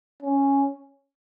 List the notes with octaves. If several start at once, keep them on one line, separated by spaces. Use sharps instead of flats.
C#4